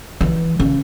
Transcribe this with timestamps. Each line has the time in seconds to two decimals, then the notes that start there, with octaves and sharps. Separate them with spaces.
0.21 E3
0.60 C#3